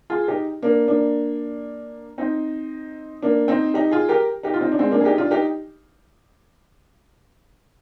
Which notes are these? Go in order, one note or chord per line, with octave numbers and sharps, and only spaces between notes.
F4 G#4
D#4 G4
A#3 D4
A#3 D4
C4 D#4
A#3 D4
C4 D#4
D#4 G4
F4 G#4
G4 A#4
D#4 G4
F4
C4 D#4
D4
G#3 C4
A#3 D4
G#4
D#4 G4
D4 F4
D#4 G4